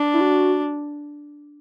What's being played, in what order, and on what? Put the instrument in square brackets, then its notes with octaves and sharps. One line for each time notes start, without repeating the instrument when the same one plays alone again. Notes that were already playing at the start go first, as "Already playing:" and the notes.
Already playing: [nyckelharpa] D4
[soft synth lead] E4
F#4